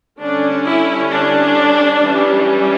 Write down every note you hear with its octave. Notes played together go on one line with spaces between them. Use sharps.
D3 G3 C#4 D4
E4
D4
E3 G3 C#4